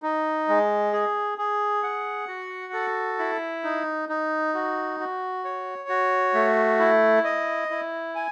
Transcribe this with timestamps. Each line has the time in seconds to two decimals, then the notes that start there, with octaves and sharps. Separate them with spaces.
0.03 D#4
0.49 G#3
0.93 G#4
1.38 G#4
1.83 F#5
2.28 F#4
2.73 A4
3.19 E4
3.64 D#4
4.09 D#4
4.54 F#4
5.00 F#4
5.45 C#5
5.89 F#4
6.34 A3
6.79 E4
7.24 D#5
7.71 E4
8.15 G#5